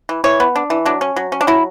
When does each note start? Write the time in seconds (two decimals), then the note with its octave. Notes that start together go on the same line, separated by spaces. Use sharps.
0.09 E3
0.24 E3 C#5
0.40 B3
0.56 D4
0.70 E3
0.86 F#3 D4
1.01 C#4
1.16 F#3
1.32 C#4
1.41 D4
1.47 F#3 E4